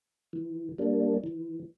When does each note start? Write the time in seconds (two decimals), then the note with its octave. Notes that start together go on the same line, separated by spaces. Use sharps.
0.33 E3
0.78 G3 A#3 D4
1.24 E3